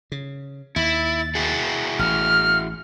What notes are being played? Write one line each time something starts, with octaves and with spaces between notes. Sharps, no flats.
C#3
D#2 E4 A6
E4 F#4 G#4
A1 F6